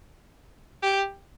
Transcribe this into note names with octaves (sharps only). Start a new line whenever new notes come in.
G4